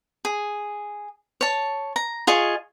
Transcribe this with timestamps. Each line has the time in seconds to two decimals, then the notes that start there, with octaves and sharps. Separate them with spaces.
0.25 G#4
1.41 C#5 A5
1.96 A#5
2.27 F4 G#4 D#5 C#6